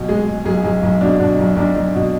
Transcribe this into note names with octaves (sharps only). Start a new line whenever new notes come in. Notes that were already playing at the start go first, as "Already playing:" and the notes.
Already playing: B1 B2
G#3 G#4
G#3
B1 G#4
B1 G#4
B1
B2 D4
B2 D4
B1
B1 D4
B1
B2